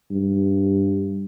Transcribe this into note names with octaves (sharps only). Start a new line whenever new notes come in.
G2